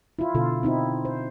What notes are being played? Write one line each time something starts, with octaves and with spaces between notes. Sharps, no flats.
E4 F4
B2 D3 F4 A4
C4 D#4 E4
C5